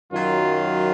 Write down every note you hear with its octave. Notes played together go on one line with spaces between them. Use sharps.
F#2 D#3 F#3 F4